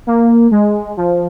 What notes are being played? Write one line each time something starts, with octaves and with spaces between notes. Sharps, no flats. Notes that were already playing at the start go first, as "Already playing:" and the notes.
A#3
G#3
F3